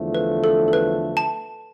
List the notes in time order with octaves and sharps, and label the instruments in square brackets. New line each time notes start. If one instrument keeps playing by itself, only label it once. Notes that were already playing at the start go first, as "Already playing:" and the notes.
Already playing: [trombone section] E2 D3 F3 A3
[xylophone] B4
A4
A4
B4
A5